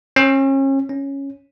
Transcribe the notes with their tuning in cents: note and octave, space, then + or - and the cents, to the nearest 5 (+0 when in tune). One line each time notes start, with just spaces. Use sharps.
C#4 -35
C#4 -5